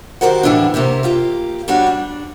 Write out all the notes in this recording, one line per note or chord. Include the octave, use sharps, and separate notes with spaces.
D#3 F#4 G4 A#4 C5 F#5
A2 D3 E3 G3 G#3 D4
C3 A#3 E4 G4
A#3 F4 G4
G3 D4 F#4 C#5
D4